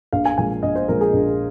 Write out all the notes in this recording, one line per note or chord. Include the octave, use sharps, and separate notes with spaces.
A#1 F5
G#5
A#2 F3 G#3 G#5
A#1 D#5
C5
A#2 F3 G#3 A#4
G#4
A#1